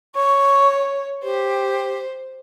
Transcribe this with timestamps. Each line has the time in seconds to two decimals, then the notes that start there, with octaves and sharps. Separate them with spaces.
0.15 C#5 C#6
1.24 G4 C5